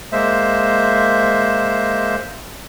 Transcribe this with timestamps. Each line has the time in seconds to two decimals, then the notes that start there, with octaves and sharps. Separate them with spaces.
0.12 G#3 A#3 C5 E5